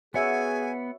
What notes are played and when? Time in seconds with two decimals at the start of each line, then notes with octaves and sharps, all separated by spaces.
0.14 B3 F#4 G#4 C#5 E5 F#5 G#5